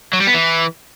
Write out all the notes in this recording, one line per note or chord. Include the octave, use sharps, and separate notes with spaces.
F#3
G3
B3
E3